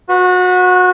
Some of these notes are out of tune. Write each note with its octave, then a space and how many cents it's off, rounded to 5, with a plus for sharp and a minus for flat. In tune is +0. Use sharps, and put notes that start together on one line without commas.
F#4 -25 B4 +0